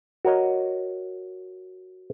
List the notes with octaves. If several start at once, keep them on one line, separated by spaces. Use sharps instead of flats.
F#4 A#4 C#5 D#5